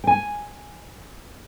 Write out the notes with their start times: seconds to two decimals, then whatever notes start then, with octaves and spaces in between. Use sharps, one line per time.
0.04 G5 G#5